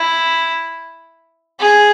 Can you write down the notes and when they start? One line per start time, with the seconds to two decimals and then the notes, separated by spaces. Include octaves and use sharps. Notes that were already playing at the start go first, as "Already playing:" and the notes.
Already playing: E4
1.59 G#4